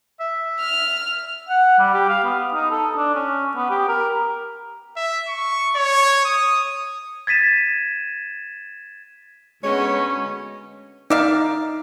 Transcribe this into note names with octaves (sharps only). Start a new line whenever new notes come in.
E5
F6
F#5
G3
G4
F5
B3
D#4
A4
D4
C#4
B3
G4
A#4
E5
C#6
C#5
D#6
G#6 A6 B6 D#7 E7
D2 G#3 B3 C#4 C#5 D#5
D#4 D5 E5 F5